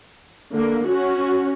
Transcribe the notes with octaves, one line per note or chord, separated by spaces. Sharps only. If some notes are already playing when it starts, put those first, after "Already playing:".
D3 A#3
C#4 F#4